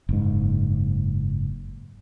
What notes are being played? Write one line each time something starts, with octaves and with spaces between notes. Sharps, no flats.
F#1 G#2